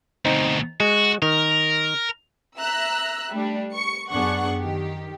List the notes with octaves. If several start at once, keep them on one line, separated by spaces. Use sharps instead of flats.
D2 B2 C4 D#4
G#3 F#4
D#3 A#4
E5 A#5 E6 F#6
G3 A3 D4
C#6 C#7
F#2 B3 D4 G#4 F#5 C#6
D#3 G4